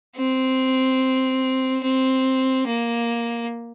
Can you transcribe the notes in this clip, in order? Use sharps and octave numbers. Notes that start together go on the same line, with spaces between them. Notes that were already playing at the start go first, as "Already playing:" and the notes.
C4
C4
A#3